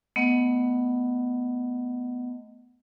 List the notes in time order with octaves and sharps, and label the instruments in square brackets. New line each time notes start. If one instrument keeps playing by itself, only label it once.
[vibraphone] A3 B3 D#5 F#5